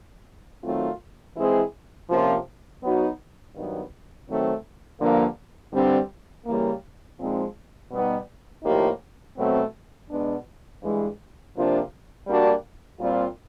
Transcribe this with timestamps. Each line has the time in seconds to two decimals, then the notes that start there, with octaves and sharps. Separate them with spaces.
0.64 D#3 F#3 A3 C4 F4
1.36 E3 G#3 C4 E4 G#4
2.09 C3 F3 A#3 C#4 F4
2.82 F#3 B3 D#4 F#4
3.55 G2 D#3 F#3 B3
4.27 D#3 F#3 A3 C4
5.00 G2 D3 F3 A#3
5.73 G2 D3 G3 C4
6.45 C#3 E3 G3 A#3
7.17 A#2 F3 G#3 C4 D#4
7.90 B2 G3 B3 D#4
8.63 A2 F3 A#3 D#4 G4
9.36 B2 F#3 A3 C4
10.09 B2 G#3 B3 D4
10.81 G2 E3 G#3
11.54 C3 F3 A#3 D4 F4
12.26 G3 A#3 D4 F#4
12.99 A#2 G3 C4 F4